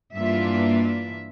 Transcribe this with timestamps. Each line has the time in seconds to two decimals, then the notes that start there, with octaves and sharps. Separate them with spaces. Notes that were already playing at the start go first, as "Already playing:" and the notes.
0.14 G2 E3 A#3 D4 F4 E5
0.82 E5